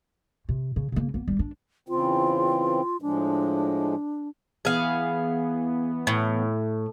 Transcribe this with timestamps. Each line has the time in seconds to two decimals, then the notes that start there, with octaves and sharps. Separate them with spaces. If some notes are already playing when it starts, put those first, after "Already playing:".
0.49 C3
0.76 C#3
0.92 C#3 A#3
1.14 A#3 B3
1.28 G3 D4
1.39 D4
1.88 E2 C#3 C4 F4
3.02 A2 F3 G#3 D4
4.65 E3 B3 G#4 F5
6.07 A2